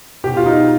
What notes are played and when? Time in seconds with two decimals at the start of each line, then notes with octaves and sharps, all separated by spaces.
0.24 B2 G4
0.37 F4
0.46 D#4